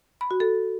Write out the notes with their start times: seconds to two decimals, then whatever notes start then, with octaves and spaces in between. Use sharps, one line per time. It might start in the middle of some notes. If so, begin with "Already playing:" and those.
0.21 B5
0.31 F#4
0.40 A4